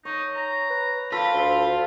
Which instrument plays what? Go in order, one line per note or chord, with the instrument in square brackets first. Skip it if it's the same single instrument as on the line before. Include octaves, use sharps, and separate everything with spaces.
[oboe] D#4 [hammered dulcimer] C#5
[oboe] A#5
[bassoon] B4
[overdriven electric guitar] F4 [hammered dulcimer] A4 C5 [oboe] B5
[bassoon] D2